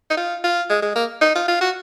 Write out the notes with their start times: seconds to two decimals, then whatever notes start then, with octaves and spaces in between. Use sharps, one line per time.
0.10 D#4
0.17 F4
0.44 F4
0.70 G#3
0.82 G#3
0.95 A#3
1.21 D#4
1.35 F4
1.48 F4
1.61 F#4